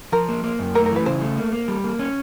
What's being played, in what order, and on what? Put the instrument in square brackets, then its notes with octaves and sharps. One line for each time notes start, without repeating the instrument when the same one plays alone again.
[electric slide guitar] F3 [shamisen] A#4
[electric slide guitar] A#3
A#3
F#2
[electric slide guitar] A3 [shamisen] A#4
[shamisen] A#4
[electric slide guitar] E3 [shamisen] B4
[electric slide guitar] C#3 [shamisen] C5
[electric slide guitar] A3
A#3
A#3
G3
A#3
C#4